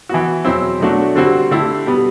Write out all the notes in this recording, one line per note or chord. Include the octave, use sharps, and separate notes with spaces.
E3 B3 F#4
E2 B2 F#3 C4 E4
B2 F#3 A3 D4 F#4
D3 G3 C4 F#4
D3 A3 E4 G4
B2 G3 B3